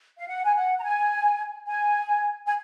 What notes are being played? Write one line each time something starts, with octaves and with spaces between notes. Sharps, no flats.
F5
F#5
G#5
F#5
A#5
G#5
G#5
G#5